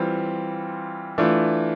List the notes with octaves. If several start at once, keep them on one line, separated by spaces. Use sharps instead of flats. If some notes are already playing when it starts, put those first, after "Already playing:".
Already playing: E3 G3 C4 F4
E3 A3 D4 F4